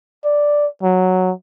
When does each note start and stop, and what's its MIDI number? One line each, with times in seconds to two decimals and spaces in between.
0.24 0.66 74
0.83 1.32 54